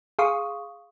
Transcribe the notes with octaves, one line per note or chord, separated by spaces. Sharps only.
G#4 F5 C6 C#6 D#6